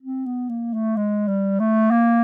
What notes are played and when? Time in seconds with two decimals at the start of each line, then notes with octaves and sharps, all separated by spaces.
0.02 C4
0.26 B3
0.49 A#3
0.73 A3
0.97 G#3
1.28 G3
1.60 A3
1.91 A#3